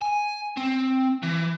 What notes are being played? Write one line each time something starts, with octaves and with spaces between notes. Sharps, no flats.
G#5
C4
E3